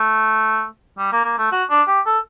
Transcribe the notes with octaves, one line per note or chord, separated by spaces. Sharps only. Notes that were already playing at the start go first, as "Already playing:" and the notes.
Already playing: A3
G3
A#3
A#3
A3
F#4
D4
G4
A4